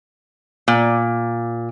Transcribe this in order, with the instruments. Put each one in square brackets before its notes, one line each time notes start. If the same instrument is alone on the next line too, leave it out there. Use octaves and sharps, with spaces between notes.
[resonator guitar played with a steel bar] A#2